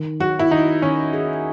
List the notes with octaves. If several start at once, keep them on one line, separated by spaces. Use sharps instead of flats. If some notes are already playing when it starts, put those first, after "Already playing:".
Already playing: D#3
F#3 F#4
E4
D#3 D#4
D#3 C#4
G#4